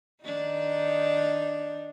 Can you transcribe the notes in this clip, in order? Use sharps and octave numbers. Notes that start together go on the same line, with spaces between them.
D#3 D4 D#4